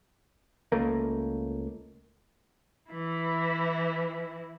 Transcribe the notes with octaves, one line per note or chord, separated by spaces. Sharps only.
C#2 A3 A#3
E3 E4